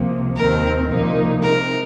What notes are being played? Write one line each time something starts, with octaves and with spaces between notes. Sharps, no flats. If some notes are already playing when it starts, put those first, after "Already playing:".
Already playing: C2 C3 F3 A#3
D#2 D#3 C4 A#4
C2 A#2 F3 A#3 D#4
C3 G#3 D#4 A#4